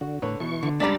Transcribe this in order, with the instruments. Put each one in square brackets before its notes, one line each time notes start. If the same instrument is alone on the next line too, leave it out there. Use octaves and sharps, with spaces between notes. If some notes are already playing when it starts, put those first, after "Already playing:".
[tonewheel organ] D3 [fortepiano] F#4
[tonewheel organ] A2 [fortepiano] D3 B4 C#5
[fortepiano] B2 [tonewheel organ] E3 C#6
[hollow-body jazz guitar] D3
[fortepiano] C#2 D5 A#5 [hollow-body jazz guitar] G3 D4 [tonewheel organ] B5 A6